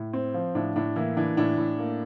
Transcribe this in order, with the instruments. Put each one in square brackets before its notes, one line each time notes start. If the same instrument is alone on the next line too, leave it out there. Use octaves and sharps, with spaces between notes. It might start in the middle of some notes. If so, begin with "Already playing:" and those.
Already playing: [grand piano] A2
C4
F3
A2 D4
A2 D4
E3 A#3 E4
E3 D4
A2 D4
A2
A#3